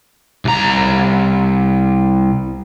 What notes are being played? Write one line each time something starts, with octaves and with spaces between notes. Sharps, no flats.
C2 A#5